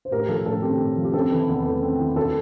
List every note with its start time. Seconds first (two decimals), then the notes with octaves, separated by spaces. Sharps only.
0.05 C5
0.11 A2 G4 A#4
0.29 F3 A4
0.45 A2 A4
0.62 C4 G4
0.80 A2
0.98 F3
1.05 G4
1.14 C4 A4
1.32 E3
1.49 E2
1.66 A3
1.82 C4
2.00 E3
2.16 D2 A4